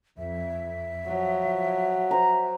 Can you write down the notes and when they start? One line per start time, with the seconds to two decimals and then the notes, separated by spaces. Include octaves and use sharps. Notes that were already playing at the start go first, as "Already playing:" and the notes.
0.18 F2 E5
1.07 F3 F#3
2.11 C5 A#5